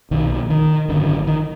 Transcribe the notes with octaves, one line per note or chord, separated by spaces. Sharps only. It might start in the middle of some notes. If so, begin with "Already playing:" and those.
B1 A#2 D#3
D#3
G#1 F#2 D3
D#3